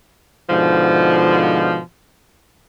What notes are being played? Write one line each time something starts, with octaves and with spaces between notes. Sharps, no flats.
G#2 B2 D3 F3